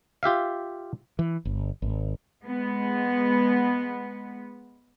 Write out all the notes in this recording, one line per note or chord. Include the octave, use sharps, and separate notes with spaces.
F4 G4 E5 F5
E3
G1
G#1
G#3 B3